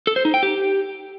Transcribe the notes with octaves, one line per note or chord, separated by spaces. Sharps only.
A4
C5
D#4
G5
G4